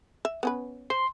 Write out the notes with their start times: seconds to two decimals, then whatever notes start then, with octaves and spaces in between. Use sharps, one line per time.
0.25 E5
0.43 B3 C#4 B4
0.90 C5 C6